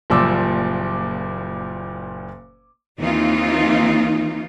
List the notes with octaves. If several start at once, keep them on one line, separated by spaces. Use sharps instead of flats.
F#1 A#2 F3 G3 D6 E6
D#2 E3 C4 D#4 F4